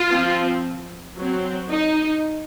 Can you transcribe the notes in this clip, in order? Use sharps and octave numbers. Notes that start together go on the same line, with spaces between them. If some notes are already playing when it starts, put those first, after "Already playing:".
Already playing: F4
F3 C4
F#3 C4
D#4